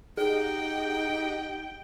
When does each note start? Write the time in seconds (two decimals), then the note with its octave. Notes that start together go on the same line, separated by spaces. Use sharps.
0.17 D#4 G4 G#4 D#5 F#5 G5